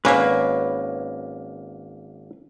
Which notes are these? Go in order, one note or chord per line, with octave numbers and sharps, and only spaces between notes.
G#1 A#3 C#4 B4 E5